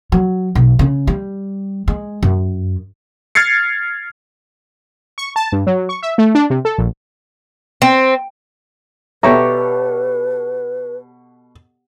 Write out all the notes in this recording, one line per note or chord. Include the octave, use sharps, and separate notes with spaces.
F#3
B1
C#3
G3
G#3
F#2
F6 G#6 A6 C7 C#7
C#6
A5
G2
F#3
C#6
E5
A3
D4
C3
A4
A#1
C4
B2 G4 A4 B4 C#5 D5 E5 A#5